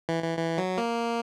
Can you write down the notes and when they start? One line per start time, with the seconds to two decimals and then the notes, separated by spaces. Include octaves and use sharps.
0.09 E3
0.23 E3
0.38 E3
0.58 F#3
0.78 A#3